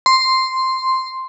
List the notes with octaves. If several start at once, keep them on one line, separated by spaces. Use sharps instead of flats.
C6